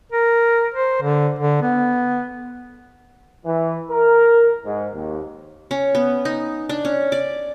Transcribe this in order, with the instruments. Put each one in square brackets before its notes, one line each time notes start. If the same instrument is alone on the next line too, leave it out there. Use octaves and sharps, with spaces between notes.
[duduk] A#4
C5
D3
D3
B3
[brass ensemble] E3
A#4
G#2
D#2
[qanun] C#4
B3
D#4
D4
C#4
D5